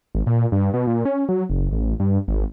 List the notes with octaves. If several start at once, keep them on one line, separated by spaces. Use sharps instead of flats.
G#1
A#2
G2
B2
A#2
C#4
F#3
F#1
A1
G2
G#1